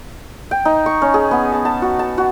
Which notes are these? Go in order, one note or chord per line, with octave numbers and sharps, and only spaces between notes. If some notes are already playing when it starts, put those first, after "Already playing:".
G5
D#4
C#6
C#4
G#4
B3
A5
A5
F#4
A5
F#4